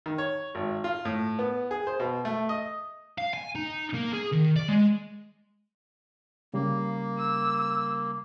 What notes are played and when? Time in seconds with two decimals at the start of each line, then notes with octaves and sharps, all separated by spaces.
0.06 D#3
0.18 C#5
0.55 G#1
0.84 F4
1.05 A2
1.39 B3
1.71 G#4
1.87 C5
2.00 B2
2.25 A3
2.49 D#5
3.18 F5
3.34 G#5
3.55 D#4
3.94 A#3
4.13 G#4
4.32 D#3
4.56 D5
4.68 G#3
6.54 C#3 G3 A#3
7.19 E6